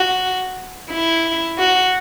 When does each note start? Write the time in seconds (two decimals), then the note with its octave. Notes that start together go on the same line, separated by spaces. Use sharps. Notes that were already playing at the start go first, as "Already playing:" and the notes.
Already playing: F#4
0.91 E4
1.58 F#4